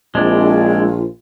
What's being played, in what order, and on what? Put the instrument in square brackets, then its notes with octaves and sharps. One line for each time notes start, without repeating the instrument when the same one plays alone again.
[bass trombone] A#1 [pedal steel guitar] G#3 D4 E4 [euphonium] C4 [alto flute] F4